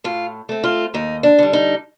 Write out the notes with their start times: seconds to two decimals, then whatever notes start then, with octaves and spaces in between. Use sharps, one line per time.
0.04 A2 F4
0.49 A3 C4
0.64 F4
0.94 D#2 D#4
1.23 D4
1.39 D3 G3
1.53 D#4